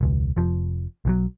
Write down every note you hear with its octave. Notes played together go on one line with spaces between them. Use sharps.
E1 C#2
F1 F2 F3
B1 E3 F#3